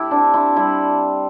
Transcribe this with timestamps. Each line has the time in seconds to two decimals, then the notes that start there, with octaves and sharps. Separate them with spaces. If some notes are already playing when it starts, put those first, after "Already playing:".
Already playing: A2 E4 G4
0.11 C4 D4
0.34 E4
0.56 G3 E4